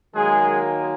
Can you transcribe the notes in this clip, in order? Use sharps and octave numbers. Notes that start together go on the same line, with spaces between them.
D#3 F#3 G#3 A#3 G#4